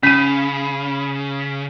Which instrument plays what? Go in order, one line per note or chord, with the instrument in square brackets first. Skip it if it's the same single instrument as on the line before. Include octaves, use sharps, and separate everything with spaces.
[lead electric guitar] C#3 [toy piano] C#4 [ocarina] B5 [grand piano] B6 D#7